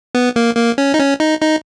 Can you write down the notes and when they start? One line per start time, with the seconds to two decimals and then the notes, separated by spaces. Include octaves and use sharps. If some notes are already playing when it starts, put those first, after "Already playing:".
0.15 B3
0.36 A#3
0.57 A#3
0.78 C#4
0.94 D#4
0.99 C#4
1.20 D#4
1.41 D#4